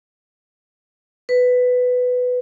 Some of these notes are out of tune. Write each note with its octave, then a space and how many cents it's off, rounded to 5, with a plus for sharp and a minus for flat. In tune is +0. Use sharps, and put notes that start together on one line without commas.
B4 +10